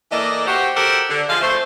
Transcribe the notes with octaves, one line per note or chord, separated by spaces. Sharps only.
E3 A#3 A4 D5 D#5
F#4 G4 C5
F#4 G4 A4 A#4 C5 F#5
D3
F3 G#3 F5
A3 C4 C5